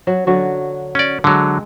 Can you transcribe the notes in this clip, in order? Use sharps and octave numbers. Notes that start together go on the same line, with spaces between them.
F#3
D3 F#3 F#4
C#4 D5
D3 F#3 G#3